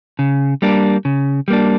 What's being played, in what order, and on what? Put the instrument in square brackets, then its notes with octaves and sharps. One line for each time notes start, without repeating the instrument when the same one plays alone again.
[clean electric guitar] C#3
G3 A#3 D4
C#3
G3 A#3 D4